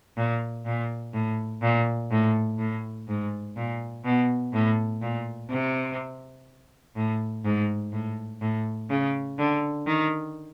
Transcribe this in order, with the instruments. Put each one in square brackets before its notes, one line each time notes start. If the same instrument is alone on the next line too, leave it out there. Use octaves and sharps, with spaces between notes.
[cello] A#2
A#2
A2
A#2
A2
A2
G#2
A#2
B2
A2
A#2
C3
A2
G#2
A2
A2
C#3
D3
D#3